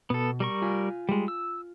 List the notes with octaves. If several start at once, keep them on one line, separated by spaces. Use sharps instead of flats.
B2 B3 A4
G3 A#4 C#6
F4 G#5
G3 G#3
E6